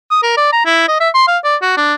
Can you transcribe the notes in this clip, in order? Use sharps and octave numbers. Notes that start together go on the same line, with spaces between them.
D#6
A#4
D5
A#5
E4
D#5
E5
C6
F5
D5
F#4
D4